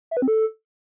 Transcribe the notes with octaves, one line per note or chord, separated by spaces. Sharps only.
E5
B4
C4
A4